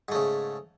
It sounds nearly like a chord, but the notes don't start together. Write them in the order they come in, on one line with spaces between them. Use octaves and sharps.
G#2 A3 C#3